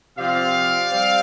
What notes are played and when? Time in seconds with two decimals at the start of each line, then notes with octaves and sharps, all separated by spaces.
0.18 C3 F3 C4 D5 F5
0.91 G3 C4